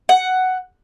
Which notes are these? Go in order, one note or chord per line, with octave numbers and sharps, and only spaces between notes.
F#5